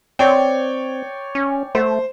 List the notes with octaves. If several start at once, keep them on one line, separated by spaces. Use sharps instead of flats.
C4 C#5 D5 G5
C#4
A3 C5